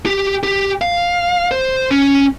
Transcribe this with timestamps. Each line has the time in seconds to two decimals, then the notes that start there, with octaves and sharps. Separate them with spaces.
0.06 G4
0.43 G4
0.81 F5
1.51 C5
1.91 C#4